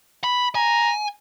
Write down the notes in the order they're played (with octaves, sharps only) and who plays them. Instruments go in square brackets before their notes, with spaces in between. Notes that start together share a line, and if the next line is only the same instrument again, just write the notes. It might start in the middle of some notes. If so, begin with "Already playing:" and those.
[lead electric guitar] B5
[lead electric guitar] G#5 [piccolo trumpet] A#5